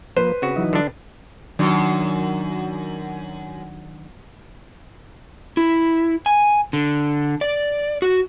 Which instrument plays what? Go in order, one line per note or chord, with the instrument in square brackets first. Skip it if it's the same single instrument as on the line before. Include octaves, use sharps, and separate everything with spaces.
[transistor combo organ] F3 A#3 [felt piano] B4 [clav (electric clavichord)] C5
[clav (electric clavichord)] C#3 F#4 [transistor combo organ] C4
[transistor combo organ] E3 F#3 D#4
[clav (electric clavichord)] D3 D4
[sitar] F#2 [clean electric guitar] D#3 F#3 D4
[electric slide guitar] E4
G#5
D3
D5
F#4